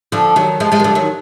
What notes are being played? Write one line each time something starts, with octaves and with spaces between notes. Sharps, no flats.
D3 F3
D#3 F#3
F3 G#3
F3 G#3
D#3
D3 F3
D#3 F#3